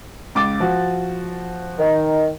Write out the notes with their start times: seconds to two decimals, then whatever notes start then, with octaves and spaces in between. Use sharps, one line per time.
0.35 C#2 D6 A6
0.60 F3 F#4
1.79 D#3